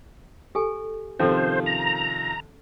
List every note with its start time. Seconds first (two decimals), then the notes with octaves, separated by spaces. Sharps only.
0.55 G4 A4 G#5
1.19 C3 D#3 F3 C#4 E4 A4 C5
1.66 A#5